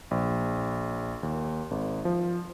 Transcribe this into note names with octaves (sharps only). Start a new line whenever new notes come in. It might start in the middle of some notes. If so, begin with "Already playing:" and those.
A#1
D#2
G#1
F3